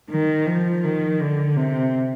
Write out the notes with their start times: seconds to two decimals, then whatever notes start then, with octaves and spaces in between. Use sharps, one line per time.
0.10 D#3
0.46 F3
0.84 D#3
1.20 D3
1.56 C3